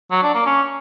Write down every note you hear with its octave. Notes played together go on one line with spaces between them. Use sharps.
F#3
D4
A#3
C#4